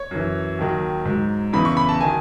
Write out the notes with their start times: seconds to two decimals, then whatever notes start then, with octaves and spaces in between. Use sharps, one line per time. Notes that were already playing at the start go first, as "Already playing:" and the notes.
Already playing: C#5
0.11 F#2 E3
0.59 D#2 D#3 F#3
1.05 G#2
1.10 F#3
1.53 E2 C#3 E3 B5
1.65 C#6
1.77 B5
1.89 A5
2.01 D#3 F#3 G#5